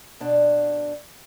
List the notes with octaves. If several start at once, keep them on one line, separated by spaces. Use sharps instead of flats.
B2 D4